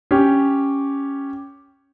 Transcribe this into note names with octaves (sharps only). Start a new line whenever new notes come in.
C#4 G4